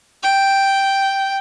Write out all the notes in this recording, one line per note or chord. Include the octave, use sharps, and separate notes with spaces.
G5